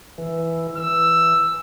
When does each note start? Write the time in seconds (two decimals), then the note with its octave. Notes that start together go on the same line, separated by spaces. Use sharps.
0.18 E3
0.77 E3 E6